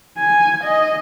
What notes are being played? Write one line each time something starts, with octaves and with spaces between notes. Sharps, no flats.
G#5
D#5